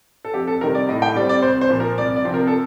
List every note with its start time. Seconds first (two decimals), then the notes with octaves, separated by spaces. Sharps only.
0.25 A4
0.34 F2 G4
0.47 A4
0.61 C3 D#3 G3 A#4
0.75 D5
0.89 A2 D#5
1.02 G5
1.16 G3 D5
1.20 C4
1.29 D5
1.42 C2 C5
1.61 C5
1.70 A#2 F3
1.80 A#4
1.98 C2 D5
2.16 D5
2.25 C3 F3 C4
2.34 A#4
2.47 A4